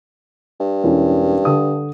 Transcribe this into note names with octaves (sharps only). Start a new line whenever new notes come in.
G2
E1 C#4 E4
D3 D#6